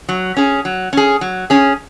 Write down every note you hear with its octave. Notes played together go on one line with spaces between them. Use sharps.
F#3
C#4 G#4
F#3
C#4 G#4
F#3
C#4 G#4